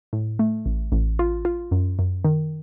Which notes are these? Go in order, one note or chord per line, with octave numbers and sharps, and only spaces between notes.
A2
A3
A1
A1
F4
F4
F#2
F#2
D#3